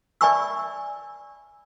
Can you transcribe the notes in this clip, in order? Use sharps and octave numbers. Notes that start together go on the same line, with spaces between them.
D5 E5 G#5 B5 C#6 E6